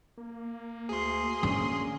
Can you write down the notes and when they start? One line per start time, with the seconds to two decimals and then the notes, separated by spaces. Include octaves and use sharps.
0.17 A#3
0.89 D2 G#4 C6
1.43 D3 C#4